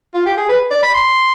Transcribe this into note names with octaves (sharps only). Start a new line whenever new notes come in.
F4
G4
G#4
B4
D5
B5
C6